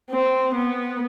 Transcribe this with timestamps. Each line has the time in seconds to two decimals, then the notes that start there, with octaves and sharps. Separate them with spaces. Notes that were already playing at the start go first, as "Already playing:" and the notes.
0.11 C4
0.54 B3